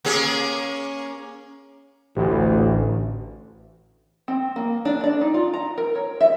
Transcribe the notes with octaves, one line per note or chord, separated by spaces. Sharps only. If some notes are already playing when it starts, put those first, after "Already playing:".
A#3 C#4 G#4
A1 D2
C4
A#3
D4
D5
D#4
F4
A#5
A#4
C#5
E5